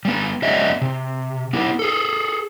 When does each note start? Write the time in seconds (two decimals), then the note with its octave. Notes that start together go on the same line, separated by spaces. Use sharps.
0.05 G3 B3
0.42 F#3 B3 C#5 D#5 E5
0.82 C3
1.53 B3 E4 G4
1.79 G#4 A4